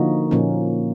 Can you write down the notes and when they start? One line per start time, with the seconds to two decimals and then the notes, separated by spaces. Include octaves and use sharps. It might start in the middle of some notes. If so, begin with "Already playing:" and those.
Already playing: D3 F3 A#3 D#4 F#4
0.31 A#2 F3 A#3 C#4